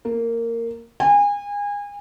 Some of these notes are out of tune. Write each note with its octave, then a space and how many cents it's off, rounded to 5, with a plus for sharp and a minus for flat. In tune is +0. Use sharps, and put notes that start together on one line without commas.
A#3 -15
G#5 -30